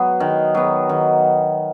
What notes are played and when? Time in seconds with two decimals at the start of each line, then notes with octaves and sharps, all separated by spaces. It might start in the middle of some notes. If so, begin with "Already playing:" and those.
Already playing: F#3 B3
0.20 D#3
0.54 F#3 B3
0.89 D#3